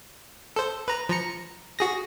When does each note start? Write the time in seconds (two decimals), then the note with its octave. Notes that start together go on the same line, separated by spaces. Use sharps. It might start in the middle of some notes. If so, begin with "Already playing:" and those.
0.56 A4 C5
0.88 B4 A#5
1.09 F3 A#5 C#7
1.79 F#4 G#4 A#6